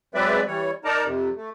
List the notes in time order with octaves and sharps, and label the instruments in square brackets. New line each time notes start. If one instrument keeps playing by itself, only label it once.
[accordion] F#3 G#3 C4 B4 D5 E5
E3 G3 C#5
D#4 A#4 D5 A5 A#5
F2 C3
A3